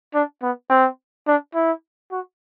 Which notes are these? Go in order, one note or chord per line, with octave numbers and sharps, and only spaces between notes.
D4
B3
C4
D4
E4
F#4